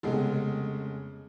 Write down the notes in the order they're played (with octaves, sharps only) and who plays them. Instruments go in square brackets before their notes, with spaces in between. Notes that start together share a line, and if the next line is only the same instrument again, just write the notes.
[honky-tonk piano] F1 C#3 G#3 B3